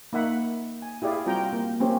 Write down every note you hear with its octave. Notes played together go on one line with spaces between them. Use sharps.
A#3 D#4 E5 F#5 B5
G#5
E4 G4 G#4 D5 F5
G3 C4 F4 F#4 G5 A#5
A#3
A#3 C4 C#4 G4 C5